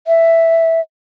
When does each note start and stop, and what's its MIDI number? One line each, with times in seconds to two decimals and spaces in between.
0.07 0.81 76